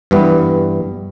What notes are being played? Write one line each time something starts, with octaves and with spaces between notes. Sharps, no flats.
G2 E3 G3 B3